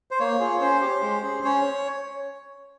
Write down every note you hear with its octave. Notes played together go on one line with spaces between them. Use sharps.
C5
A#3 C#5
F4 G#4
C#4 C5
G4
G#3
C#4 G#4
C#4 C#5